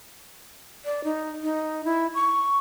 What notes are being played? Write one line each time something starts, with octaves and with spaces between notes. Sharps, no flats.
D5
D#4
D#4
E4
C#6